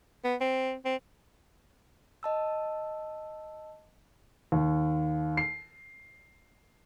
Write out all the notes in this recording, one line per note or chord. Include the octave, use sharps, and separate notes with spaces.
B3
C4
C4
D#5 A5 E6
D#2
C7